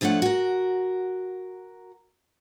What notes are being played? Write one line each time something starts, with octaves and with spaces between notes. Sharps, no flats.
D2 D3 F3 A3 C#5 F#5
F#4 A#4